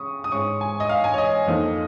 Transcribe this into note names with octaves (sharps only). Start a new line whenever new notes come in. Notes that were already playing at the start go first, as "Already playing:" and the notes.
Already playing: C#3 C#6 D#6
D#6
G#2 G#3 C#4 C#6
G#5
D#5
F5
G#5
C#5
D#5
F2 F3 A#3 D#4